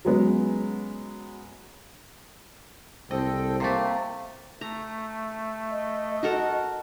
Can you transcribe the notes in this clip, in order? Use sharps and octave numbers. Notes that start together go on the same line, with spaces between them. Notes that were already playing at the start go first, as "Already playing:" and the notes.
F#3 G#3 B3 C#4
C2 A4 C5 D#5 G5
C3 A3 A#3
A3 A#5
D#5
F#4 A4 A#4